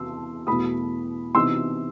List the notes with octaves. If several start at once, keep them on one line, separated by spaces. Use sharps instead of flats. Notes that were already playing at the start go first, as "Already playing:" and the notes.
Already playing: E2 C3 E3 B3 C6 E6
E2 B2 A3 B5 D#6
C3 E3 B3 D#4 C6 E6